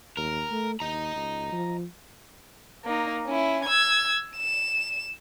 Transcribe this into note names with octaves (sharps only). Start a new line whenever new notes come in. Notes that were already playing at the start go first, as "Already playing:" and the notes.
D#2 A#4
A3
D#2 D#5 A#5
C#2
F3
A#3 D#4
C#4 E4
E6 G#6
E7